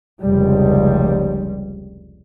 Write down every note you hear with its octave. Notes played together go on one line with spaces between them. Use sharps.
F1 C#2 G3